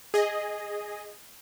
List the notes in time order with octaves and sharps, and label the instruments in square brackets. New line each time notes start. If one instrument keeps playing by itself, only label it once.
[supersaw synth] G#4 D#5